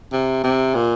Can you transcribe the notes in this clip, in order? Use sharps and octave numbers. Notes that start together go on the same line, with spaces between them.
C3
C3
A#2